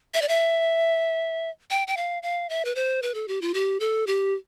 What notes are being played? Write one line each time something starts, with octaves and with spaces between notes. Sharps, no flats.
E5
D5
E5
G5
G5
F5
F5
E5
B4
C5
B4
A4
G4
F4
G4
A4
G4